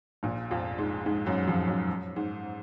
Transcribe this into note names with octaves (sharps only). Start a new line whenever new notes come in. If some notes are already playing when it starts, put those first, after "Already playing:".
A#1 A#2
F2 F3
G#2 G#3
G#2 G#3
F#2 F#3
F2 F3
F#2
G#2